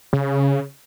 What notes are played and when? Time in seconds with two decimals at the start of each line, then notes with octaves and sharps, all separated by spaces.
0.13 C#3